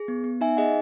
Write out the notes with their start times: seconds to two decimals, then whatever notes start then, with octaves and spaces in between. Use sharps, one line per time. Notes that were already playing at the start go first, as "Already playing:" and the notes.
Already playing: G#4
0.08 B3
0.24 B3
0.41 D#4 E5 G#5
0.57 G#4 D#5 F#5